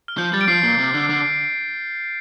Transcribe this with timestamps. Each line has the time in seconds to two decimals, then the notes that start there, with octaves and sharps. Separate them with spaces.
0.08 F6
0.18 F3 G6
0.33 G3 A6
0.41 D7
0.48 F3 C7
0.63 A#2
0.79 C3
0.94 D3
1.09 D3